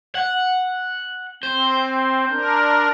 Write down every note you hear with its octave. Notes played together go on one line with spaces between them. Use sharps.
F#5
C4 C5
D4 A#4